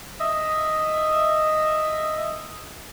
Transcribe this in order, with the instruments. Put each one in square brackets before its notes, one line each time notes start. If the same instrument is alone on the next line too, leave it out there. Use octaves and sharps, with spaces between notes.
[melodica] D#5 E5